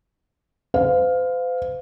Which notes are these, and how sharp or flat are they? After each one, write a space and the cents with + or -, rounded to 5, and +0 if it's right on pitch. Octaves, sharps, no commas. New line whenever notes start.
C5 -45 F5 +10